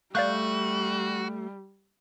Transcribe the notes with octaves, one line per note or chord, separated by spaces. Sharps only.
G3 A3 F#4 D5 F5 F#6 G6